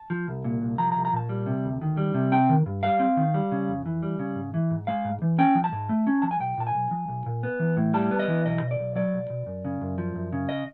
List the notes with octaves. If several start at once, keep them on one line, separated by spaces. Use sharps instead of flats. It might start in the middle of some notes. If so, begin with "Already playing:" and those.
Already playing: A5
F3
C2
A#2
C2
F3 A#5
C2 A#5
A#5
A#2 A5
G3
C3
D2
D#3
G3
C3
C4 G5
D#3
G2
G3 F5
C4
D#3
G3
C#3
F2
E3
G3
C#3
G#2
E3
G#2
G#3 F5
G#2
E3
C#4 G5
F3
A5
G#2
A3
C#4
F3 A5
G#5
B1 G5
A#2 A5
G#5
B1
F3
B1
A#2
B3
E3
A2
G3 A5
B3
D#5
E3
B1 D#5
B2
D5
B1
F#3 D5
B1
B2
F#2
C#3
F#2
F3
F#2
C#3
D#5